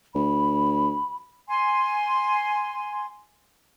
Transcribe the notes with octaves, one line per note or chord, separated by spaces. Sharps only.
D2 B5
G#5 C6